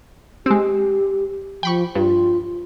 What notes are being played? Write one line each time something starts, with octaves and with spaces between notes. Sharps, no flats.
G#3 C4 G4
F3 G5 B5 C#6
G2 F4